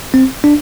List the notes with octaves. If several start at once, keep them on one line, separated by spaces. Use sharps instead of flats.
C4
D4